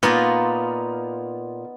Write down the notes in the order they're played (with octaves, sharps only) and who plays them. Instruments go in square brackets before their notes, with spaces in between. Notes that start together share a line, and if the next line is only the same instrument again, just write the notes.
[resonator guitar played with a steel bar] A#2 [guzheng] B3 D#4 F4